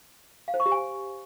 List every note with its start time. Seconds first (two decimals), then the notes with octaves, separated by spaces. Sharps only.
0.48 F5
0.54 C5
0.60 C#6
0.66 G4
0.72 G#5